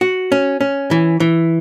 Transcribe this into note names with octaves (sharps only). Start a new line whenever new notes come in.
F#4
C#4
C#4
E3
E3